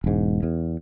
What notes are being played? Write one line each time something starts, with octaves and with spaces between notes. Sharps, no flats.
E1 G#2
E2